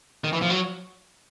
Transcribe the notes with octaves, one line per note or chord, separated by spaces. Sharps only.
D#3
E3
F3
F#3